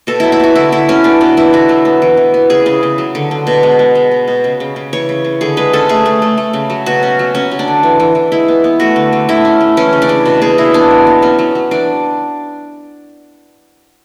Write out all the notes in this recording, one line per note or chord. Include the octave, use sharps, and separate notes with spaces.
B2 A4
F#3 E4
E4
B3 F#4
D3 E4
D3 E4
F#3 C#4
B3 D4
B2 D4
B2 E4
D3 F#4
F#3
B3
E3
E3
B3
C#3 G#4
C#3
C#3
F#3
D3
D3
B2
G#3
G#3
G#3
G#3
B2
C#3
C#3
C#3
E3 C#5
C#3
C#3
D3 G#4
G#3 B4
C#4 A4
A3 G#4
A3
A3
A3
C#3
F#3
B2 F#4
C#4
F#3
F#3 C#4
F#3
D4
D3
E3
E3
E3
G#3 E4
B3
B3
A3 F#4
D3
D3
A3 E4
C#4
A3
E3 C#4
C#3
D4
C#3
B2
B2 G#4
B2 E4
B3 D4
E3
B3
F#3 C#4
F#3
F#3
E3 D4